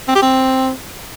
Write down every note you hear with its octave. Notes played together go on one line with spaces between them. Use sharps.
C4
G4
C4